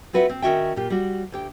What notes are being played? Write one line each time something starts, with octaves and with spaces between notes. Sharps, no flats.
C4 F4 F#4 B4 E5 F#5
C4
D#3 F#3 C#4 F#4 E5 G5
A#2 F4 G4
G3 F#4
D2 G4 G5